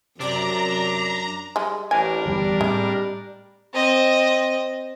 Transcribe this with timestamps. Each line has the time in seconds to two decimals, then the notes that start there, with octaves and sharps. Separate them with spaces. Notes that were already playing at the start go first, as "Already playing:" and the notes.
0.20 F#2 C3 D4 D5 A#5 D6
1.56 G3 G#3
1.91 A1 D4 A#4 G#5
2.26 G1 E2 G3
2.61 A2 G#3 C4
3.73 C4 D#5